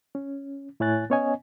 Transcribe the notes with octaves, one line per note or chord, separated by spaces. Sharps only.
C#4
A2 E4 C#5 G#5 F#6 A6
B3 C#4 C#5 D#5 G#5